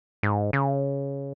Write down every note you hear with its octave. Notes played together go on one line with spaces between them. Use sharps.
G#2
C#3